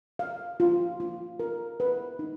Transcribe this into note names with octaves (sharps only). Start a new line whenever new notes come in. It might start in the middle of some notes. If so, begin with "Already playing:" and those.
F5
F4
F4
A#4
B4
D#4